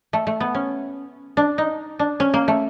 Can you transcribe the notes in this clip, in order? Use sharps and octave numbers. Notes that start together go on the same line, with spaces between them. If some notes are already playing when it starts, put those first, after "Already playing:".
A3
A3
B3
C#4
D4
D#4
D4
C#4
A#3
A3